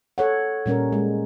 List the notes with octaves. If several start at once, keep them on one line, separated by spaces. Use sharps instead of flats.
A4 C#5 F#5
A#2 G3 C#4 A#4
G#3